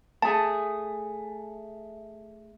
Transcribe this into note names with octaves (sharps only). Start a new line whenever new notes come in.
A3 G#4 A5